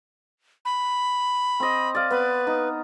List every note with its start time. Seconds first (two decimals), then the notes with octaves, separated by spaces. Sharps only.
0.65 B5
1.60 C4 D#5
1.95 D5 F5
2.11 B3 B4
2.47 D#4